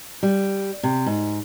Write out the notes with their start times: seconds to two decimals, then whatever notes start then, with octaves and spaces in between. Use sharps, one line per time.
0.23 G3
0.83 C3
1.06 G#2